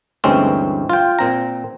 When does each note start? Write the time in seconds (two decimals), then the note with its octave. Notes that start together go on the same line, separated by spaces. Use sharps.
0.24 D2 G2 E3 G#3 C4 C#4
0.90 F4 G5
1.19 A#2 C4 A#5